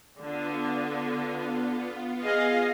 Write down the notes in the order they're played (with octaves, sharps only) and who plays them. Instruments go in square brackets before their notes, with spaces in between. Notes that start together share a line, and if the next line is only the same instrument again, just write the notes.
[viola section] D3 [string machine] B3 F4
[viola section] G#4 D#5 F5